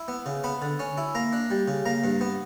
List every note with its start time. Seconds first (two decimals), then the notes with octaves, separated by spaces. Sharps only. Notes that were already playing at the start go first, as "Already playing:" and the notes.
Already playing: E4
0.08 B3
0.26 C#3
0.44 B3 B5
0.62 D3
0.79 C#4
0.98 E4
1.15 A#3 A#5
1.33 D4
1.50 G3
1.68 C#3
1.85 A#3 A#5
2.04 G2
2.21 B3